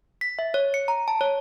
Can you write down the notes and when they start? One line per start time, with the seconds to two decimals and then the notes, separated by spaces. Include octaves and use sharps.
0.21 B6
0.39 E5
0.54 C#5
0.74 C#7
0.88 A#5
1.08 A5
1.21 C#5